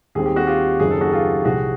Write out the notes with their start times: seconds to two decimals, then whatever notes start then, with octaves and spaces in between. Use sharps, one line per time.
0.15 D#2 D#3 G3 C4 G#4
0.26 G4
0.36 F#4
0.47 F4 G4
0.80 F#1 F#2 D#3 F#3 G#4
0.91 A4
1.01 F#4 G#4
1.12 F4 G4
1.45 C2 C3 F3 F#4 G#4